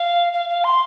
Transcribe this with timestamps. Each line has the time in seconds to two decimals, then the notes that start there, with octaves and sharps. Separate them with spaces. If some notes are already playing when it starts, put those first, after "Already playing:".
Already playing: F5
0.33 F5
0.49 F5
0.64 C6